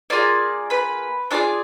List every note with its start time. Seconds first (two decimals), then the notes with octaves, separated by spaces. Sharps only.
0.10 A#3 F4 G#4 D5 D6
0.70 B4 B5
1.31 D4 F4 G#4 D5 D6